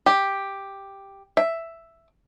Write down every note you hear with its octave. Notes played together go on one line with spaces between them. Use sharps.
G4
E5